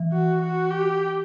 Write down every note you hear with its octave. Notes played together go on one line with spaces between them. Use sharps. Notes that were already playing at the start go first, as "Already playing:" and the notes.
Already playing: E3
F#4
F#4
G4